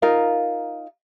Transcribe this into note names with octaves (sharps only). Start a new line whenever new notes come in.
D#4 F4 A#4 F5